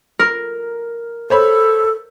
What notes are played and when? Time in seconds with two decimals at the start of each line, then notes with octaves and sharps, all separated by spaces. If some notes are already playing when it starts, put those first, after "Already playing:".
0.19 A#4
1.30 A4 C5 C#5 B5